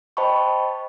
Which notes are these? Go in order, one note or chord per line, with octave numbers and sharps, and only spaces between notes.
C5 D#5 G5 A5 B5 C#6